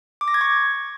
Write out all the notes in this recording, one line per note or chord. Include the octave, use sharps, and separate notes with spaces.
D6
A#6
G#6
C#6